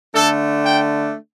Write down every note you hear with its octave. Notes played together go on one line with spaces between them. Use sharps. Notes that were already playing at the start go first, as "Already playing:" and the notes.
D3 A3 D4 A4
G5